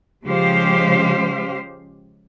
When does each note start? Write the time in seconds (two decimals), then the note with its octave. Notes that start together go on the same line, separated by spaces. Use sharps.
0.24 C#3 F3 G#3 G4 C5 F5